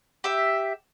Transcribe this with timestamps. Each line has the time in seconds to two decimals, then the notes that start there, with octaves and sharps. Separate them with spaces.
0.24 G4 E5